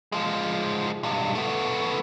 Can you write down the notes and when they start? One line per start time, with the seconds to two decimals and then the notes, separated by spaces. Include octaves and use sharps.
0.12 F3 G#3
1.03 B1 G2
1.35 A3 B3